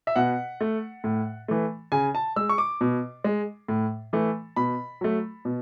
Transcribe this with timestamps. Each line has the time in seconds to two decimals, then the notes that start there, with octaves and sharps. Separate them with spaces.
0.07 E5
0.16 B2 F#5
0.61 A3
1.04 A2
1.48 E3 A3
1.92 C#3 G#5
2.15 A5
2.36 G#3 E6
2.49 C#6
2.58 D6
2.81 B2
3.24 G#3
3.68 A2
4.13 E3 A3
4.56 B2 B5
5.01 F#3 A3
5.45 B2